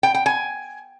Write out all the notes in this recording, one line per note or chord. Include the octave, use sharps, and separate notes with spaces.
G5
G5
G#5